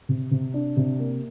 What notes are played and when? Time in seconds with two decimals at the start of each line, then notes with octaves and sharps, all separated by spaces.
0.09 C3
0.31 C3
0.54 D4
0.77 C3
0.99 A#3